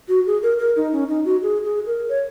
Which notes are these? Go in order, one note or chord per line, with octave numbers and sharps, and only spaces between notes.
F#4
G#4
A#4
A#4
D#4
C#4
D#4
F#4
G#4
G#4
A#4
C#5